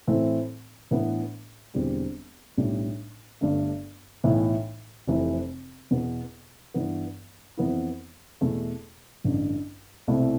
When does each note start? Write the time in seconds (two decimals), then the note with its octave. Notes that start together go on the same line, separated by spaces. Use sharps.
0.07 A2 E3 A3 C4 E4
0.91 A2 E3 B3 D4
1.74 E1 E2 D3 G3 C4
2.57 B1 A2 G3 D4
3.41 G1 G2 D3 A3
4.24 B1 A2 E3
5.07 F1 F2 C3 E3 A3
5.91 E2 B2 B3
6.74 G2 E3 B3
7.57 F2 E3 B3 E4
8.41 E2 B2 A3
9.24 A1 G2 D3
10.08 C2 B2 A3 C4 E4